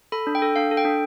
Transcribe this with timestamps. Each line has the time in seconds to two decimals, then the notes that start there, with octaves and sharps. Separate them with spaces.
0.12 A4 B5
0.27 D4
0.35 G5
0.42 A4
0.56 D4 F5
0.71 A4
0.77 G5
0.85 D4